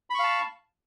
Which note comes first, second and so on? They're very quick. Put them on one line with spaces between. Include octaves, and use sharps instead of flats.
B5 C#6 F5 A5